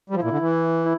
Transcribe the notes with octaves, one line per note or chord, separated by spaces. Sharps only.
G3
F3 E4
A#2
D3
E3
E4